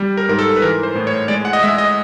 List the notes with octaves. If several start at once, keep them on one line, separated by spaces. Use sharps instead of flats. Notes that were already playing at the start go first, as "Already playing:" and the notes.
Already playing: G3
A#4
G#2 A#4
A4
B4
E3 A#4
C5
A2
C#5
G#3 D5
F#5
D#5
G#3 E5
D#5